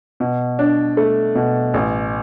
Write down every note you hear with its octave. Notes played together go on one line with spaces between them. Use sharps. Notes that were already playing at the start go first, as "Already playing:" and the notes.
B2
D4
A3
B2
A1